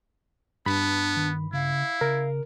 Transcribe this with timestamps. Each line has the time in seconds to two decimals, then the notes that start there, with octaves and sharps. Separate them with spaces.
0.66 G2 B3 D4 B5
1.17 D#3
1.53 C#3 E4 F5
2.01 C#3 A#4